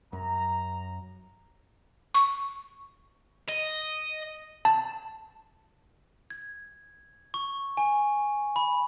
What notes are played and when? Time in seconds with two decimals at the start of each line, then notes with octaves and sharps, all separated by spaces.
0.13 F#2 A#5
2.14 C#6
3.49 D#5
4.65 A5
6.30 G#6
7.34 C#6
7.77 G#5
8.56 B5